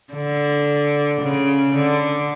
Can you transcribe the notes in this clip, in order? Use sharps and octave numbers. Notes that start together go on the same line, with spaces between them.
D3
C#3
D3